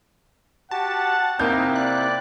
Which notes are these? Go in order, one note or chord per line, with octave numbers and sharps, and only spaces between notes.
F#4 G4 F#5 A5
C3 A#3 C4 D#4 E4 G6
D5 F#6